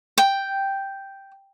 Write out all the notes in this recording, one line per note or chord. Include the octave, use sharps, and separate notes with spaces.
G5